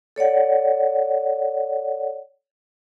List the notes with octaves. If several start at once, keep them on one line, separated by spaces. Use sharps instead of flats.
A4 C#5 D5 F#5